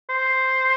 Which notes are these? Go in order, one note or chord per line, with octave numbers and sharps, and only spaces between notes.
C5